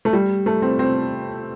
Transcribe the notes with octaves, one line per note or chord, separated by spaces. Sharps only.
A3
G3
A3
C4
C4